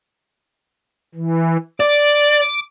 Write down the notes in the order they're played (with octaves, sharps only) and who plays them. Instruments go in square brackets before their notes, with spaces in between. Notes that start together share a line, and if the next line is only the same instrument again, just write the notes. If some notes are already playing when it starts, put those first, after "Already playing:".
[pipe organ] E3
[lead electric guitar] D5 [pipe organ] D6